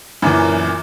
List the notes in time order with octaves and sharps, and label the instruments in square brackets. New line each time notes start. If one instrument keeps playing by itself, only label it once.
[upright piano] F#2 A#2 E3